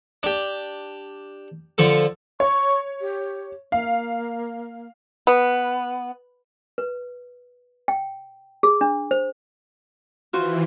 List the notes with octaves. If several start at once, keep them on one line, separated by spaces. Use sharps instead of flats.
D4 G4
D3 F3 A4
C#5 C#6
G4
A#3 F5
B3
B4
G5
G#4
D4
C5
E3 F4 F#4 C5